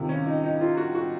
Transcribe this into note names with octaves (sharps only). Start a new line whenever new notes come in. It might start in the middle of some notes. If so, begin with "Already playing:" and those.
Already playing: C#2 C3 D#3
C#4
D#4
D#4
F4
F#4
F#4